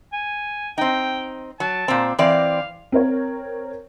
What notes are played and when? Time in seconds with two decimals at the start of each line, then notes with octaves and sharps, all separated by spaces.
0.13 G#5
0.78 C4 D#4 G5
1.60 F#3 A5
1.88 A#2 C4
2.19 E3 C4 D5 F5
2.92 C4 A#4 C#5